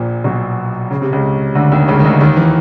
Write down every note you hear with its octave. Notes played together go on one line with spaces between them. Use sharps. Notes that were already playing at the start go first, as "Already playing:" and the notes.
Already playing: A#1 A#2
B1 B2
C#3
C3
C#2 C#3
D2 D3
D#2 D#3
C#2 C#3
D#3
D2 D3
D#2 D#3
E3